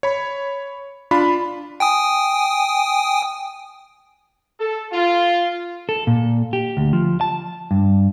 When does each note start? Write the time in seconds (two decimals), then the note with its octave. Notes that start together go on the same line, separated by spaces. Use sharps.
0.03 C#5 B5
1.11 D4 F4 B5
1.80 G5 G#5 D#6
4.60 A4
4.92 F4
5.89 A4
6.07 A#2
6.53 G4
6.77 D2
6.93 F3
7.21 A5
7.71 G2